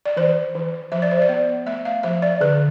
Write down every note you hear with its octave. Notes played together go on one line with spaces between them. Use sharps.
D5
E3 C5
E3
F3 E5
D5
C5
D5
B3
A3 E5
F5
F3 E5
D5
D3 B4